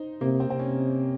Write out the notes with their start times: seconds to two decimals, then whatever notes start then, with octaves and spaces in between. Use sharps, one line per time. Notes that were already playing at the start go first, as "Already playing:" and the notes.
Already playing: D#4 C5
0.21 C3 A#3
0.40 C4
0.50 C3 C4
0.59 C#4